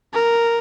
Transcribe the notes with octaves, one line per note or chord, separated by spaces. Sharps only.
A#4